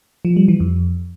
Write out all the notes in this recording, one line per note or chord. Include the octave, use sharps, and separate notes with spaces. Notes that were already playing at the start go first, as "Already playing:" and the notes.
F3
G3
E3
F2